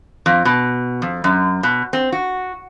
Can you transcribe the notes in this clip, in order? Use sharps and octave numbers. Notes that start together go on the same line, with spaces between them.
F2
B2
F2
F#2
B2
C4
F#4